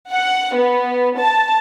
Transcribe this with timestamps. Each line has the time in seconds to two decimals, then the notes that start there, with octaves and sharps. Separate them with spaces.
0.13 F#5
0.56 B3
1.19 A5